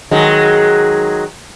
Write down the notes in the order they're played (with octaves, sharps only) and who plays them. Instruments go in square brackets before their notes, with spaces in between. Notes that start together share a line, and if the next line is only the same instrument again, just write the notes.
[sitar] D#3 F#3 G#3